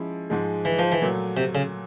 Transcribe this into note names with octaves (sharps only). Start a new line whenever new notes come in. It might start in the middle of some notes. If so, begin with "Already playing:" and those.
Already playing: F3 G#3 C#4 E4
G#2 F3 G#3
E3
F3
E3
A#2 F#3 A3
C3
C#3